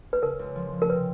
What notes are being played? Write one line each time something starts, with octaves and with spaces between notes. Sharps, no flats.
B4
C#3 A#4
C#2
F3
C#2
A#4
C3 B4